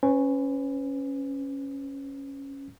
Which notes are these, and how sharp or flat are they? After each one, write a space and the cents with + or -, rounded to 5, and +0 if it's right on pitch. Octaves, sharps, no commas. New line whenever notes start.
C#4 -5 B4 +35